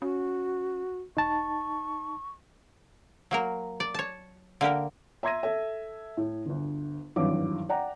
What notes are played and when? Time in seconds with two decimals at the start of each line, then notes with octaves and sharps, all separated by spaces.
0.02 C#4 F#4
1.17 E1 D#4 A5 C#6
3.31 F#3 A#3 A#4
3.80 D5
3.94 C#5 A5
4.61 D3 A#3 G4 A#4
5.23 E5 A#5 C6 G#6 A#6 D#7
5.43 A4 E5
6.17 A2
6.45 G1 D2
7.16 G#1 E2 G2 F#3 E4 D6
7.69 D5 F#5 G5 A#5